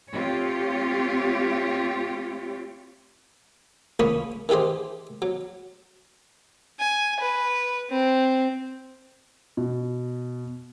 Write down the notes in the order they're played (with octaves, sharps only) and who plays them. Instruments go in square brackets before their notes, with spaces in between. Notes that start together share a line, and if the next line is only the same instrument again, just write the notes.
[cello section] A3 C4 F4 G4 C#5
[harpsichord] C#2 A#3 C#4 B5 C#6 D#6
D#3 E3 G4 G#4 C5
F#3
[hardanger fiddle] G#5
B4
C4
[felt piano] B2